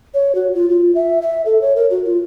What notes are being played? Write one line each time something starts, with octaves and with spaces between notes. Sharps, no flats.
C#5
F#4
F4
F4
E5
E5
A4
C#5
A#4
F#4
F4